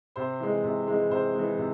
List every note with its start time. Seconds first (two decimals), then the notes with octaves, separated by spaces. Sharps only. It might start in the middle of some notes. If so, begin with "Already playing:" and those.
0.16 C3 C5
0.40 E3 G#3
0.64 C3
0.88 E3 G#3
1.10 C3 C5
1.34 E3 G#3
1.58 C3